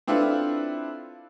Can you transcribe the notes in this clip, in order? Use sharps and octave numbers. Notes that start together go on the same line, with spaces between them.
C4 D4 E4 F4 A4 B4